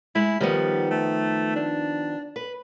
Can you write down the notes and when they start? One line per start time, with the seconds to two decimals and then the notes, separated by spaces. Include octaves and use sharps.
0.15 G#3 E4
0.41 D#3 F3 G3 B3
0.91 A3
1.56 D4
2.36 B4